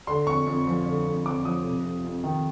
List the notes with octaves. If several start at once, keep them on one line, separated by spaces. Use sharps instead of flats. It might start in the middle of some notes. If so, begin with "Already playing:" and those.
D3 C6
F2 C#6
F2
F3
D3
F2
F2 D6
F3 D#6
C3
F2
F2
D#3